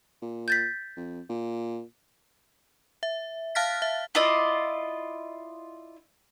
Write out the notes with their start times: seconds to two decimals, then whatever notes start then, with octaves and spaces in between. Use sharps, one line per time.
0.22 A#2
0.48 G6 A6 B6
0.97 F2
1.29 A#2
3.03 E5
3.55 F5 A5 F6 F#6 A6 B6
3.82 E5
4.15 E4 F4 D5 D#5